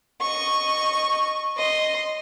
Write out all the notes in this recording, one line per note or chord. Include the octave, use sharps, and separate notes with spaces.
D#5 C#6
D#5 C6